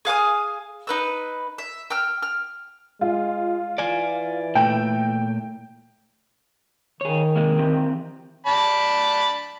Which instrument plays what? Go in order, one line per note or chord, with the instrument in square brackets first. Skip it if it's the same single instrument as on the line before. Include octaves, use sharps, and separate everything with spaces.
[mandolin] G#4 F5 G#5 D#6
D#4 B4 E6
E5
G5 E6 F6
F6
[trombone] G#3 [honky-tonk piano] F4
[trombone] E3 [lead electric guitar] D5 G#5
[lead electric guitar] A#2 A3 [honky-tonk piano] G5
[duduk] D#3 [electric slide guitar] G#4 C#5
[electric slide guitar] C3 G#3 A#3
E3 C4 G4
[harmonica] D5 A5 B5